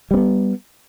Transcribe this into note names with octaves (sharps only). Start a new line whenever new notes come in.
G3 B3 C4